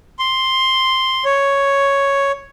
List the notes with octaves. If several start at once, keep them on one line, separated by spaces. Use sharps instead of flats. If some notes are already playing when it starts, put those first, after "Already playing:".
C6
C#5